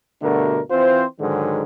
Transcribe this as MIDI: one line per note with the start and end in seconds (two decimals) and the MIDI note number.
0.22 0.61 43
0.22 0.61 47
0.22 0.61 50
0.22 0.61 57
0.22 0.61 66
0.22 0.61 70
0.71 1.04 52
0.71 1.04 60
0.71 1.04 65
0.71 1.04 72
1.20 1.63 44
1.20 1.63 50
1.20 1.63 51
1.20 1.63 54
1.20 1.63 56